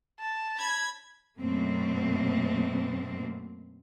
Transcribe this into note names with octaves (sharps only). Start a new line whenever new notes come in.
A5
B5 G#6
F#2 B2 A3 A#3 C4